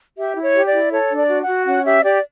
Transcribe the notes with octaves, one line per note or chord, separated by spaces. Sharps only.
G4 E5
E4
C#5
G4
D5
E4
A4 C#5
D4
D5
F#4
F#5
F#4
C#4 F#5
G4 E5
G4 D5